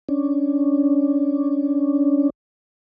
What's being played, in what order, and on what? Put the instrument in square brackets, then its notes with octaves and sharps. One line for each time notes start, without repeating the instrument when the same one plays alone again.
[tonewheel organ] C#4 D4